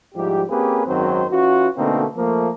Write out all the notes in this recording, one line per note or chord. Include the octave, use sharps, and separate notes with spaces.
G#2 F3 G3 E4 G4
A#3 C4 C#4 G4 G#4 B4
G#1 F#2 D#3 F#3 C4 C5
E3 C#4 F4 F#4
B2 D3 A3 A#3 C4 D#4
F3 A3 A#3